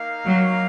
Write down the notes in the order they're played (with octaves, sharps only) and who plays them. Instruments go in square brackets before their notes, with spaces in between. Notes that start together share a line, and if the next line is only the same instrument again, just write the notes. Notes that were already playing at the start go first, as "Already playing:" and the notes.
Already playing: [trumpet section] A#3 D#4 A#4 F5
[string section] F#3